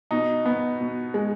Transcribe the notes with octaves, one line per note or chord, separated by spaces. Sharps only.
B2 D#4
B3
B2
G#3